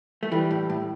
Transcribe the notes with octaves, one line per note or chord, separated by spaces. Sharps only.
A3
E3 G3
A2
A2